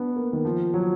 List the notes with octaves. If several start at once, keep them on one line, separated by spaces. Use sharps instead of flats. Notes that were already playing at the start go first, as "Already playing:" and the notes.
Already playing: B3 D4
A#3
D#3
F3
F#3